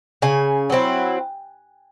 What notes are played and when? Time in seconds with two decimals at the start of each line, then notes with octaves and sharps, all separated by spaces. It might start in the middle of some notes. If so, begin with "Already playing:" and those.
0.22 C#3 G#5
0.70 F#3 C4 E4